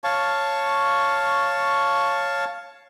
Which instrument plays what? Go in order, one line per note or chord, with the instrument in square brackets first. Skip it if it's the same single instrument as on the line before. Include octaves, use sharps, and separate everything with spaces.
[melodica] C#5 F5 A5 C#6